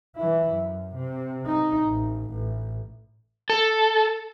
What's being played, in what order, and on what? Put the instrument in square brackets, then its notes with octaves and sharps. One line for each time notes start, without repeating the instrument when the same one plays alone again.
[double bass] E3 E4
F#2
C3
D#4
A1
A1
[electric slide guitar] A4